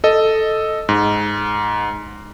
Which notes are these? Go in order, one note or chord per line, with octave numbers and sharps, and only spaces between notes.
A4 D#5
G#2